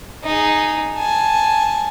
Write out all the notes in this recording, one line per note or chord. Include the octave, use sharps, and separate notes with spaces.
D#4 G#4
G#5 A5